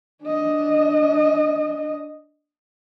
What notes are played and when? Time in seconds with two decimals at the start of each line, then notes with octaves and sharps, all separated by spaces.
0.24 D4 D#5